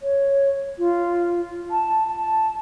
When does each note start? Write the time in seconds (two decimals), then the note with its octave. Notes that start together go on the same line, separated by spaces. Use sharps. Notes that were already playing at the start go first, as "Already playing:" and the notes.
0.01 C#5
0.79 F4
1.71 A5
2.07 A5